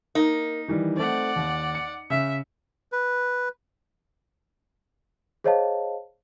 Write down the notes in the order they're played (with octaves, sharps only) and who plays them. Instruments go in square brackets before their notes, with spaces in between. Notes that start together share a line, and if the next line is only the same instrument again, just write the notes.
[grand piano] A#3 [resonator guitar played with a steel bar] D#4
[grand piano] D#3 E3 G3
[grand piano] A3 C4 [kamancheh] D5 F#5
[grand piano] D#2
C#7
[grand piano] C#3 [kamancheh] E5
[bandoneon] B4
[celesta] G#4 C5 C#5 D#5 F5 A5